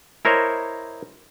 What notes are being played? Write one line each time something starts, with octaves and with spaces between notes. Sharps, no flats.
E4 A#4 C5 C#5 D#5